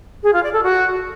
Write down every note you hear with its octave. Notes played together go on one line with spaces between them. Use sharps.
G#4
F4
D5
A4
F#4